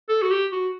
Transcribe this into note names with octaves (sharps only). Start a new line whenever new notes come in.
A4
F#4
G4
F#4